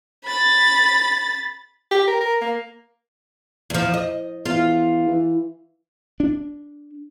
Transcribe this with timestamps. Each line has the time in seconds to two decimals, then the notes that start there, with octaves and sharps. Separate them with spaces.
0.25 B5 A6
1.91 G4
2.08 A#4
2.21 A#4
2.41 A#3
3.70 E2 F3
3.94 D#5
4.46 E2 F4
5.07 E3
6.20 D4